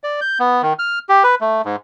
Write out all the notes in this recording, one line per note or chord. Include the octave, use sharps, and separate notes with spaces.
D5
G6
B3
D#3
F6
G4
B4
A3
G#2